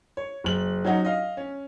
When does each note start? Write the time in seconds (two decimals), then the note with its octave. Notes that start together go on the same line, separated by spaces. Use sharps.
0.17 C#5
0.44 F#1 F#7
0.85 F#3 C#4 D#4 F#4
1.05 D#5 F5
1.37 C#4